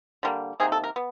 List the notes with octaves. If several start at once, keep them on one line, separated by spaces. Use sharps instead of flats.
D3 G3 A#3
C3 D#3 A#3 G#4
A4
A#4
B3